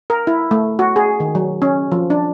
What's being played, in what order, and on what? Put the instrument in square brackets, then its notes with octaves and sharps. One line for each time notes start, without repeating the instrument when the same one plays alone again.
[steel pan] A#4
E4
A3
F#4
G#4
D#3
F#3
C#4
F3
D4